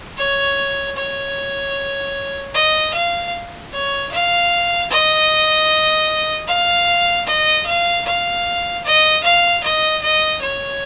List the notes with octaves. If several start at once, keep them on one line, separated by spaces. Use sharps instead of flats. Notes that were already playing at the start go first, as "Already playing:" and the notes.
C#5
C#5
D#5
F5
C#5
F5
D#5
F5
D#5
F5
F5
D#5
F5
D#5
D#5
C#5